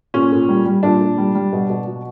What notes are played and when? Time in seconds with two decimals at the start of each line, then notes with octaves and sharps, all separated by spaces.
0.14 A#2 C#4
0.32 A#2
0.48 G3
0.65 G3
0.83 A#2 D4
1.01 A#2
1.18 G3
1.35 G3
1.52 B2
1.70 B2
1.87 F#3